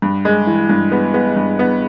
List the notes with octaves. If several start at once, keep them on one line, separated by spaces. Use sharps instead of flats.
G2
G#3
E3
G2
B3
B3
G2
B3